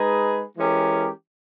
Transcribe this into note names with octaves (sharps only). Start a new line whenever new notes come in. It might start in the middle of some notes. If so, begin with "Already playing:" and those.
Already playing: G#3 D#4 G#4 B4
E3 G#3 C#4 G4 A#4